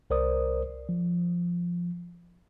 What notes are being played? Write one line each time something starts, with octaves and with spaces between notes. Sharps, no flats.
C2 A#4 C5 D5 D#6
F3